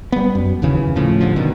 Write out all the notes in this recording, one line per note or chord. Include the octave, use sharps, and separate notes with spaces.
G3 B3
F#2
F#1 D#2 C#3 E3
A2 C#3 F3
G1 D3 F3
B2 D#3